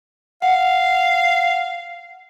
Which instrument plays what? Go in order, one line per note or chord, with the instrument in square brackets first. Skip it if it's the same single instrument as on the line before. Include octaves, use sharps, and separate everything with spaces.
[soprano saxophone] F5 [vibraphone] F#5